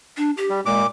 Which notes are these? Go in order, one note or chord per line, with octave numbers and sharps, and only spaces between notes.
D4
G4
G3
A#2 G#3 D6